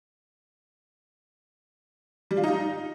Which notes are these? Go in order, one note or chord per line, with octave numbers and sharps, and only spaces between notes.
G3
F4
D#4